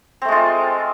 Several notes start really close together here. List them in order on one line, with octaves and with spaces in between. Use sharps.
C4 A3 G#3 F4